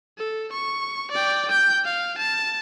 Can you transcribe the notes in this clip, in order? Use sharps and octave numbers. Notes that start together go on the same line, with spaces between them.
A4
C#6
D5 G5
G5 G6
F5
A5